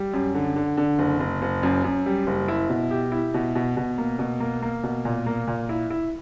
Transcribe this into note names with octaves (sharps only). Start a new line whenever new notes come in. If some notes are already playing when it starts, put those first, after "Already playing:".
Already playing: G3
F#2
D3
D3
D3
F#1
F#1
F#1
F#2
F#2
G3
F#1
E4
B2
G4
E4
B2
B2
B2
A#3
B2
A#3
A#3
B2
A#2
A#3
A#2
E4
E4